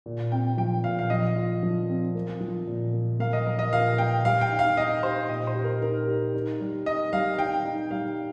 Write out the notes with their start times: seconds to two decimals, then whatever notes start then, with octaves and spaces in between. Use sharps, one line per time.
0.06 A#2
0.32 C4 G5
0.57 F3 G5
0.84 A#2 F5
0.99 F5
1.10 F3 D#5
1.36 F4
1.63 F3
1.89 C4
2.15 A#3
2.41 F3
2.67 A#2
2.93 A#3
3.20 A#3 F5
3.33 D#5
3.46 F3 A#4
3.59 D#5
3.72 A#2 F5
3.98 A#3 G5
4.24 G3 F5
4.41 G5
4.51 D#4
4.59 F5
4.77 D#4 D#5
5.02 G4 C5
5.29 A#2 D#5
5.47 C5
5.55 G4
5.64 A#4
5.81 D#4 A#4
6.07 G4
6.34 D#4
6.60 G3
6.86 D#4 D#5
7.13 G3 F5
7.39 D#4 G5
7.65 D#4
7.91 G3 F5